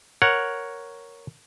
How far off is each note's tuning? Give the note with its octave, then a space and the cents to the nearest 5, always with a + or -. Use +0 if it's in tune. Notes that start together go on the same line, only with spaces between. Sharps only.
A#4 +5 C#5 +0 F#5 +0